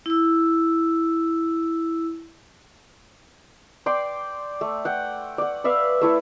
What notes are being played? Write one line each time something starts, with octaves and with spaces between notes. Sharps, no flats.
E4 E6
D5 G5 C6 D6
A3
F#5 G5
D5 F#5
B4 D5 E5 F5
A3 E4 A4